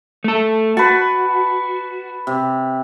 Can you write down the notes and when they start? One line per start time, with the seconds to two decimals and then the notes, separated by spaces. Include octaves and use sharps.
0.24 A3 A4
0.77 F#4 B4 A5
2.27 C3